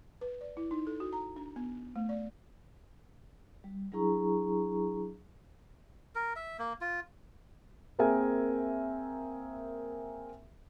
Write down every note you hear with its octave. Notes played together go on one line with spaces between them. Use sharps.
B4
D5
E4
D#4
A4
F#4
A#5
D4
B3
A3
D5
G3
F#3 D4 E4 G#4 A#5 C#6
A#4
E5
A#3
F4
A#3 C4 G#4 A#4 E5 G#5